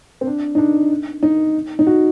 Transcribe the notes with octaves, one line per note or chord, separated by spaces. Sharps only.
C4
D4
D#4
D4
D#4
D#4
F#4